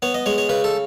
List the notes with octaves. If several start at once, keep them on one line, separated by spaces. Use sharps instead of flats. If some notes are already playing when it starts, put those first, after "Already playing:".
B3 C#5
D#5
G#3 C#5
C#5
C#3 B4
A4